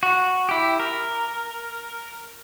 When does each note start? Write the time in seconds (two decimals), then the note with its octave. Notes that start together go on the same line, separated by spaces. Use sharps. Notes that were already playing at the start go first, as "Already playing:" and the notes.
0.03 F#4
0.49 E4 G4
0.80 A#4